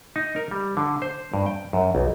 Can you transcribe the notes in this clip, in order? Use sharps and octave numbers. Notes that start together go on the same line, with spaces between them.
D#4
A#4
G3
D3
C5
G2
G5
F#2
B1